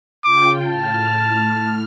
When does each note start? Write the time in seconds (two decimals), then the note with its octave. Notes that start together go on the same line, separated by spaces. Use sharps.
0.24 C#3 F4 G5 D6
0.66 A2 A5 F6